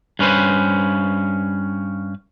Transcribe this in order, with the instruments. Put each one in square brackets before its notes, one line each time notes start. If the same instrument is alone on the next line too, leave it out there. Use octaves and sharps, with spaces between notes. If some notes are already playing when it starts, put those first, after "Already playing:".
[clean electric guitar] G2 C#4 B4 C5